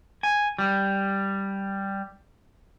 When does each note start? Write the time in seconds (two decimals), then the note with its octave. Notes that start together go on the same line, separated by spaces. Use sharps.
0.23 G#5
0.58 G3